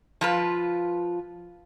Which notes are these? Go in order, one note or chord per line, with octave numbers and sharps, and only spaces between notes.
F3 F4 B4